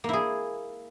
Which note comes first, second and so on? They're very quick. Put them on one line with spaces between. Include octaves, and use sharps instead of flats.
A#3 E4 G#4